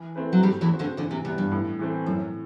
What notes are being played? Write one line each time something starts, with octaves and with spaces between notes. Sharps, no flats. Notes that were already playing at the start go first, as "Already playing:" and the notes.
Already playing: E3
A3 C4 E4 B4
F#3
G2 G3 A3
E2 E3
C4 F#4
D2 D3
D2 D3 E3
C3
C3 G3 B3
G2
A2
E3 A3 C4
F#2 A2